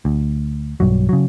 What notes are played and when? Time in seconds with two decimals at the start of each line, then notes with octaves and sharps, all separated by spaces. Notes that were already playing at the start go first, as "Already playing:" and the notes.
0.05 D2
0.80 B1 G2 F#3
1.09 C#3 F#3